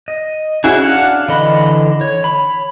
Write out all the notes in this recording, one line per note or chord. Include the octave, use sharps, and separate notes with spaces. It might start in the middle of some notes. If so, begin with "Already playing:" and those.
D#5
C#4 E4 F#4 G#4
D4 F5 F#5
D3 E3 D#5 B5
C#5
B5